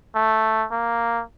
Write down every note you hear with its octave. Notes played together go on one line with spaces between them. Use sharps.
A3
A#3